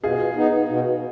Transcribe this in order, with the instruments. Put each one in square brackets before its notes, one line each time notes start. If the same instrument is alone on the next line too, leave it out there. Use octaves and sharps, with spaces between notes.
[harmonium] B2 [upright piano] F4 G#4
[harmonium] B3 D#4
B2